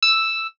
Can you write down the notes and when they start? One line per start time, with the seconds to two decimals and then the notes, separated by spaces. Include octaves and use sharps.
0.02 E6